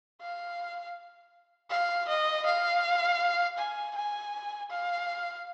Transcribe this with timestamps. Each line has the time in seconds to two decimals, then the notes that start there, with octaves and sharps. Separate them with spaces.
0.22 F5
1.71 F5
2.08 D#5
2.46 F5
3.58 G#5
3.95 G#5
4.70 F5